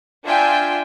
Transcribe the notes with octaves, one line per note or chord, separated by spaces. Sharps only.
D4 F4 E5 G5 G#5